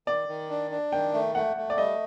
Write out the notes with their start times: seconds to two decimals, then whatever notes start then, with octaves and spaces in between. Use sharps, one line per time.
0.07 D#3 D5
0.28 D#3
0.50 D4
0.71 D4
0.92 D#3 G5
1.14 A3
1.35 A3 F#5
1.56 A3
1.70 D5
1.78 G3 D#5